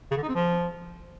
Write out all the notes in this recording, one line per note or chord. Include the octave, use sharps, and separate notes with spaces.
C#3
D3
D#4
C4
F3